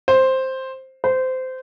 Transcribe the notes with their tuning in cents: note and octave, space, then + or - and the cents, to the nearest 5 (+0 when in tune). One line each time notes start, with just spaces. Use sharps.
C5 +5
C5 -20